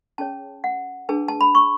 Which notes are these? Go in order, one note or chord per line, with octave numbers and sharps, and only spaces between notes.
C#4 G#4 C#5 A5
F#5
D4 G#4 B4 A5
A5
B5
C#6